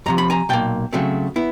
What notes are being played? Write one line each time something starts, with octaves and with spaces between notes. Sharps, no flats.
F2 C3 F3 A#5
B5
G#5 A#5
B1 A#2 A#3 G5 A5
C#3 F#3 A3 C4
B3 E4